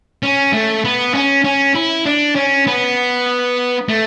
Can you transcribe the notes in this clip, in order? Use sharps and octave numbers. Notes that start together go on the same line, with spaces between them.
C#4
A3
B3
C#4
C#4
E4
D4
C#4
B3
A3